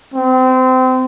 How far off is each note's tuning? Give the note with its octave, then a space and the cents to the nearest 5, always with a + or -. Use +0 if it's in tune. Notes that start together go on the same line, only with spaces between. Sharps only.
C4 -25